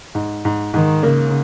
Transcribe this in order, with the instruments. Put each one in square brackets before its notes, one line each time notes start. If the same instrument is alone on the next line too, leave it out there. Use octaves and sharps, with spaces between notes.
[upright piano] G#2
G#2
[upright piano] G#2 [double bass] D#3
[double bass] C#3 [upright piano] A#3